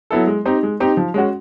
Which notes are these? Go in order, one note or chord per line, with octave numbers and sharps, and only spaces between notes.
F#3 B3 E4 A4
G#3
C4 D#4 G4
G#3
C4 D#4 G4
F3
G#3 C#4 F#4